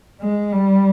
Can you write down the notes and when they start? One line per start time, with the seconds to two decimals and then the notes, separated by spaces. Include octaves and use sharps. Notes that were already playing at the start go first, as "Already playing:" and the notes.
0.21 G#3
0.52 G3